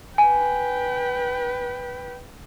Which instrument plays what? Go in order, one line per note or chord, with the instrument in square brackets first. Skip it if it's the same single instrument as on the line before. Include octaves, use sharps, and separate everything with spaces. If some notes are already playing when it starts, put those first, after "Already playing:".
[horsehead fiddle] B4 G5 [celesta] G#5